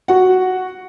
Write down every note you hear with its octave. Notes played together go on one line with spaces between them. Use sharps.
F#4 F#5